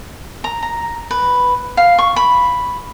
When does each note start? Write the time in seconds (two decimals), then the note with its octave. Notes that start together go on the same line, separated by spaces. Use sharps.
0.44 A#5
0.62 A#5
1.11 B4
1.77 F5
1.98 C#6
2.16 B5